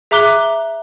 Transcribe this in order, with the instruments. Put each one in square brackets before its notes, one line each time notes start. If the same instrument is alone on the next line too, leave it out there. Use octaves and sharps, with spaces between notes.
[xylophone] G#4 E5 A#5 D6 F#6 G7